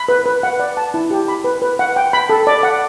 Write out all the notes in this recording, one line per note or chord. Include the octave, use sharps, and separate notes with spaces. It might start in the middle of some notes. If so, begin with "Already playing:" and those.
Already playing: B5
B4
B4
F#5
D5
A5
E4
G4
B5
B4
B4
F#5
G5
B5
A4
D5
F#5